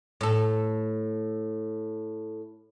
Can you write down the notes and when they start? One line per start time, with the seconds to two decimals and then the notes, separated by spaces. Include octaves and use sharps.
0.21 A2 A4